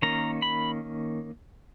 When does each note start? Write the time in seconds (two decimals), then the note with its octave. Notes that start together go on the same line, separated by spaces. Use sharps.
0.02 D#3 A#3 C#4 A#5
0.42 B5